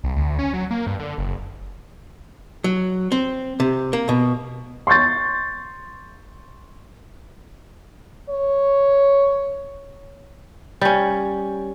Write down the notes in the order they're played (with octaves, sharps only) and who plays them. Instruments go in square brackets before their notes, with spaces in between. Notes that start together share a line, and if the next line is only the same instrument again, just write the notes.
[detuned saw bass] C2
D2
C#4
F#3
A#3
G2
D3
F#1
[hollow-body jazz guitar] F#3
C4
C3
A#3
B2
[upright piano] C6 C#6 G6 A6
[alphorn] C#5
[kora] G3 C#4